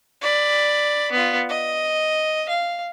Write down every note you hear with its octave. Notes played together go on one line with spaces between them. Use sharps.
D5 B5
B3 F4
D#5
F5